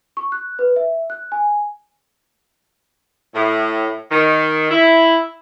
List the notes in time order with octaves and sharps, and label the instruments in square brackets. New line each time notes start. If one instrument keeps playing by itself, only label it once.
[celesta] C#6
F#6
B4
E5
F#6
G#5
[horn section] A2
D#3
E4